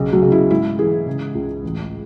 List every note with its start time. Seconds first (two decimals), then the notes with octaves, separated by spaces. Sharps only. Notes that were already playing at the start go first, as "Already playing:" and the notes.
Already playing: B1 C#3
0.12 F#3
0.22 C#3
0.32 E4
0.50 G#2 E4
0.79 E3 G#4
1.07 C#3
1.35 C#2
1.64 A1